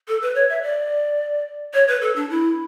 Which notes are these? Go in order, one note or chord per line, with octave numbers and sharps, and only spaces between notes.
A4
B4
C#5
E5
D5
C#5
B4
A4
D4
E4